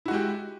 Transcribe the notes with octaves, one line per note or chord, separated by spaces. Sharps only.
G#3 E4 F#4 G4